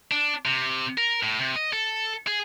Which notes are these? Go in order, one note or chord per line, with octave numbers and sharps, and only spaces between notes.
D4
C3
A#4
A2
C3
D#5
A4
G#4